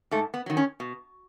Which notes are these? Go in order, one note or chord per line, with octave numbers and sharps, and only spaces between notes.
G#2 A3
B3
D#3 F#3
C#4
B2